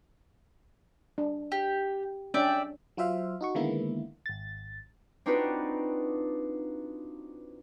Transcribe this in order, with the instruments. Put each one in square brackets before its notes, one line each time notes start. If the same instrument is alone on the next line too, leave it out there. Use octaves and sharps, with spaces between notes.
[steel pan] D4
[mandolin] G4
[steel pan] C#4 D4 [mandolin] D5 E5 G5
[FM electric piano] F#3 F4 C5 E5 F5
D#4 F#4 C#6
D3 D#3 G#3 A#3 B3 E4
G#1 A6
[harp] C4 D4 D#4 F4 F#4 B4